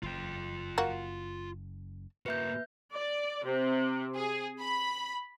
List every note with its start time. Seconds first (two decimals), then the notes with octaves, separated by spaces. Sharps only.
0.03 F#1 F4 G5
0.78 A#3 F#4
2.26 A#3 F#4 B4 E5 G6
2.94 D5
3.44 C3
4.15 G#4
4.59 B5